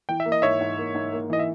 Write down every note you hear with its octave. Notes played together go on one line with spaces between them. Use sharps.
E3 G5
E5
A#3
D#5
G#2 C#5 E5
G#2
A#3
G#2
A#3
E3 D#5
E5